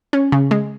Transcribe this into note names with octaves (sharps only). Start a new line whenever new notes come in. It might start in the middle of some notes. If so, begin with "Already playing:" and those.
C#4
C#3
G#3